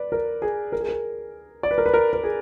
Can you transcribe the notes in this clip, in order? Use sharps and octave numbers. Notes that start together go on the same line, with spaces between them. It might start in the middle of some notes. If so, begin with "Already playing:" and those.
Already playing: B4 D5
A#4
G#4
A#4
G#4
A#4
D5
B4
A#4
B4
A#4
A#4
G#4